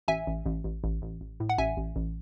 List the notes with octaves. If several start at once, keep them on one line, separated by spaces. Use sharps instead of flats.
A1 E5 G#5
A1
A1
A1
A1
A1
A1
A2
F#5
A1 E5 G#5
A1
A1